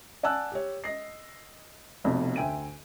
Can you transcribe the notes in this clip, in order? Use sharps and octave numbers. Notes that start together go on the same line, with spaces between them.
D5 F#5 G#5 A5 E6 F#6
G4 C#5
D#5 A#6 C7
F1 F2 B2 D5
D2 E5 G5 G#5 D7 D#7